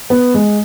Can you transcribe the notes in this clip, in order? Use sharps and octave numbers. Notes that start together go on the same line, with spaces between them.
B3
G#3